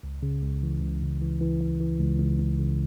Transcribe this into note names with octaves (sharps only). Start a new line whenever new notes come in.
C#2
C#3
C#2
E3
C#2
C#2
E3
E3
E3
E3
C#2
C#2
C#2
C#3